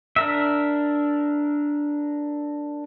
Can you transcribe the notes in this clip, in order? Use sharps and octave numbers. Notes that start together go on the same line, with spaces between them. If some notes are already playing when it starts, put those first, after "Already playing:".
D4 A#4 E5